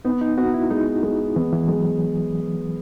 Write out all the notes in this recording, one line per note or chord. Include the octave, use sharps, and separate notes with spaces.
B3 D#4
D#4
B3 F#4
E4
G#3 D#4
G#3
E3 B3
E3
F#3 G#3